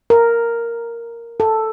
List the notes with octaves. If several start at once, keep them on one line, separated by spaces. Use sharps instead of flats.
A#4
A4